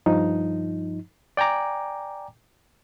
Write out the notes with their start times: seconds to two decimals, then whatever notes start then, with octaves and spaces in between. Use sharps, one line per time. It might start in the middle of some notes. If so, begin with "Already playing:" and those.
0.06 G2 F3 D#4
1.37 D5 G5 G#5 A#5 D6